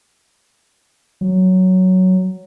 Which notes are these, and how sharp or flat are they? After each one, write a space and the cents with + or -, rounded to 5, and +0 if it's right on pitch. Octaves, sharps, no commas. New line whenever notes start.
F#3 +5